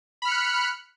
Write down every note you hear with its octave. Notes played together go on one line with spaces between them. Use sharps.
B5 F6 F#6 C#7